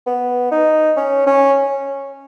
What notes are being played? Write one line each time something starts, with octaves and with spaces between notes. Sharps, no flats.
B3
D#4
C#4
C#4